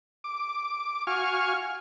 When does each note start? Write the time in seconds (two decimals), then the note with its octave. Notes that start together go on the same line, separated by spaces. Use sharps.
0.24 D6
1.07 F#4 F5 G#5 C#6 F6